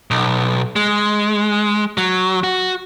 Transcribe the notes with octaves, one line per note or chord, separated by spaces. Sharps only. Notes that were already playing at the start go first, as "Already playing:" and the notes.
B1
G#3
F#3
F#4